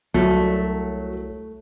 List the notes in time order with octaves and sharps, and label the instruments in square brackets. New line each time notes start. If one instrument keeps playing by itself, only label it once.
[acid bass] C2 [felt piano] F#3 [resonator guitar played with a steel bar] A3